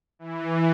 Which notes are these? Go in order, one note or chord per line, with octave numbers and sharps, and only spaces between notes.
E3